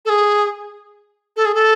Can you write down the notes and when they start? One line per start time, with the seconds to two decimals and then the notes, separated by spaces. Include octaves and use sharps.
0.05 A4
0.09 G#4
1.36 A4
1.45 G#4
1.54 A4